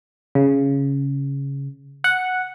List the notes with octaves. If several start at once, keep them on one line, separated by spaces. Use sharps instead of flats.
C#3
F#5